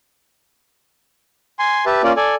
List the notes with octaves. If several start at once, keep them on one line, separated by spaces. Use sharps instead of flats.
G#5 C6
G4 B4 E5 A5
A#3 C#4 F4 D5
A4 D5 G#5